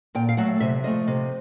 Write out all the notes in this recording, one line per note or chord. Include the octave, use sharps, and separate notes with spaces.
A#2 G5
F5
F#3 A3 F#5
C3 E5
F3 A3 D#5
C3